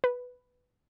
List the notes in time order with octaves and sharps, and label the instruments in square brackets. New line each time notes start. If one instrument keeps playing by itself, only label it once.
[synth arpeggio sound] B4